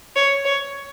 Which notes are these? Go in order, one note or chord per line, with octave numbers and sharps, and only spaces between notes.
C#5
C#5